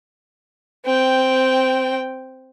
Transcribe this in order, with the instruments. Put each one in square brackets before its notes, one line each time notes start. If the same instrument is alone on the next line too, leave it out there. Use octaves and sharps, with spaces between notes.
[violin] C4 G5